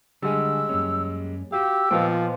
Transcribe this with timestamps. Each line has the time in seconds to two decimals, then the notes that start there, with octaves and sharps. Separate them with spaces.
0.22 D3 G3 G#3 F#5 G#5 E6
0.69 F#2 A#3 C#4
1.52 F#4 G4 F5 E6
1.91 A#2 F3 B3 D#5 F5 G5